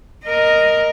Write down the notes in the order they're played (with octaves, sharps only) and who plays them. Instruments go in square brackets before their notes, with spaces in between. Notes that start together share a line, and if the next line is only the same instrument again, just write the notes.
[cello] A#4 D#5